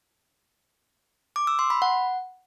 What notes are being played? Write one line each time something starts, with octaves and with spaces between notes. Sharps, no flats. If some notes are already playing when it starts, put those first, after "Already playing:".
D6
E6
C6
B5
F#5